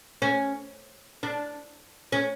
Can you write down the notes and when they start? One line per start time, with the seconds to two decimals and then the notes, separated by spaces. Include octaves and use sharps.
0.22 C#4
1.23 D4
2.12 C#4